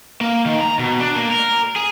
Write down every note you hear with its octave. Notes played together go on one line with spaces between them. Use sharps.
A#3
D#3
A#5
B2
D4
A#3
A#4
G#4